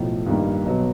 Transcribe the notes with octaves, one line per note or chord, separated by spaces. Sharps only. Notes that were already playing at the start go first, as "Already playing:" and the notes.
Already playing: B1 A2 F3
G2 D#3 G3 A#3
B1 B2 F#3 B3